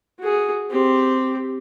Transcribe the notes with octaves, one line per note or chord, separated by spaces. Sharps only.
F#4 G#4
C4 G4